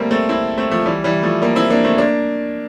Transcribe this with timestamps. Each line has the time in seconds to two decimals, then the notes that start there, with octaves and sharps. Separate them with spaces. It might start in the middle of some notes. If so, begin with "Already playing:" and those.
Already playing: G3 A3 A#3 C4
0.11 A3 C4
0.29 C4 E4
0.58 A3 C4
0.71 F3 A3
0.86 E3 G3
1.04 E3 G3
1.23 F3 A3
1.42 G3 A#3
1.56 C4 E4
1.70 A#3 D4
1.84 A3 C4
1.98 A#3 D4